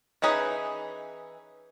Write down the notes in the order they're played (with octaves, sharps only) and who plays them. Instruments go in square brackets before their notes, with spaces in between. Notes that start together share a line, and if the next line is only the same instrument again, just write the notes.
[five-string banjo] E3 C#4 D#4 G#4 B4